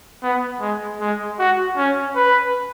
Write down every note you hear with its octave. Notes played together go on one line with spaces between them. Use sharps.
B3
G#3
G#3
F#4
C#4
B4